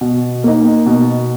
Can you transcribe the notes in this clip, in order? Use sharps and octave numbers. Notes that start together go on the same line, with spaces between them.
B2
A#3 D#4
B2